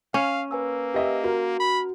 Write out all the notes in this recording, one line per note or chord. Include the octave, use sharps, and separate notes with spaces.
C#4 F5
A#3 B4 G#5 E6
G4 D#5 E5
F#4 A#4
B5